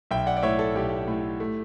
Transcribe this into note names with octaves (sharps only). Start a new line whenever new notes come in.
B1 E5 G5
D5 F#5
D5
A2 C#5 E5
A4
B1 G4
A2
A3